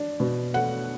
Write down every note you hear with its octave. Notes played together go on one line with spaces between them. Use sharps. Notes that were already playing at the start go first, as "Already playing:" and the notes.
Already playing: D4
B2
A3 F#5